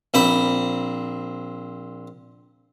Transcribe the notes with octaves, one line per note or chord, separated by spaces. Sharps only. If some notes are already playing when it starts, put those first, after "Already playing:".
A#1 C4 B5